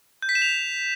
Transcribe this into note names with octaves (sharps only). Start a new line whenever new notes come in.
G6
B6
E7
F7